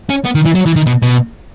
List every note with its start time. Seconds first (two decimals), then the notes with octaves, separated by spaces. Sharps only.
0.09 C#4
0.25 B3
0.35 D#3
0.45 E3
0.55 F#3
0.66 E3
0.76 D#3
0.87 B2
1.02 B2